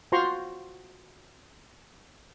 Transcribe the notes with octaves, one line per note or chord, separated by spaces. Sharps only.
F4 F#4 C5 A#5 C6 C#6